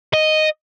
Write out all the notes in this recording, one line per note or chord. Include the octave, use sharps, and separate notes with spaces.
D#5